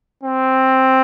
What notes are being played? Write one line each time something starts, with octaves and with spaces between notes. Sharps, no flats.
C4